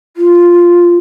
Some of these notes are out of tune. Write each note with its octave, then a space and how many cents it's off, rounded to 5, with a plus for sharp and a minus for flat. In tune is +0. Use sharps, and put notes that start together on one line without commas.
F4 +0